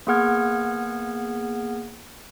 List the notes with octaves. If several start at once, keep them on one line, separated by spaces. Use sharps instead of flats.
A#3 B3 G#4 F#5 F6 G#6